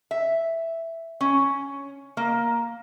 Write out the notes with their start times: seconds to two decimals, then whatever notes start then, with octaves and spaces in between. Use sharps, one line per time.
0.11 E5
1.21 C#4
2.17 A#3